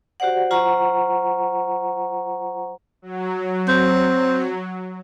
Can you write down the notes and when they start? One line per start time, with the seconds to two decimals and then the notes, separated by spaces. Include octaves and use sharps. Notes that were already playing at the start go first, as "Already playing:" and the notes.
0.20 F#4 G4 C5 D5 F#5
0.51 F#3 F4 C5 F#5 A#5 C#6
3.02 F#3
3.69 C4